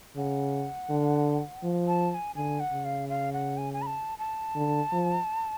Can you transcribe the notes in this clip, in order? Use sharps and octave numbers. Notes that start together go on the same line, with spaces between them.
C#3 F#5
D3
F3
A5
A5
G#5
D3 G#5
F#5
C#3
F5
F5
F#5
G#5
G#5
B5
A5
A5
D3
F3